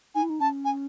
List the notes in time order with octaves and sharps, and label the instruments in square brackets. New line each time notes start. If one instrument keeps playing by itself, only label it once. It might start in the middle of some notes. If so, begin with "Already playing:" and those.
[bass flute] D#4 [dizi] G#5
[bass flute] E4
D#4
[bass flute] C#4 [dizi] A5
[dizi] G#5